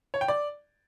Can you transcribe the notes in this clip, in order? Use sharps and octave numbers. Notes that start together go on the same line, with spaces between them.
C#5
G5
D5